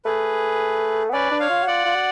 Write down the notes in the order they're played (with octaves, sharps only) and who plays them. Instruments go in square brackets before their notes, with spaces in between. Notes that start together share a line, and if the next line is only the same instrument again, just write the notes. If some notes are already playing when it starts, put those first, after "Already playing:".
[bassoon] A3 [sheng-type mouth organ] G#4 B4
[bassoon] B3
[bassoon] C#4 [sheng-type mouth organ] B4 D5
[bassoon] D4
[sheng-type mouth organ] C#5 F5
[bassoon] F4
F#4
[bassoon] F4 [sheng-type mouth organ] D5 F#5
[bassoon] F4
F#4